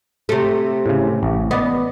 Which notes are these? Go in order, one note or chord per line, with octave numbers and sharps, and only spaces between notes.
C3 A3
A2 C#3
A1
B3 D5 D#5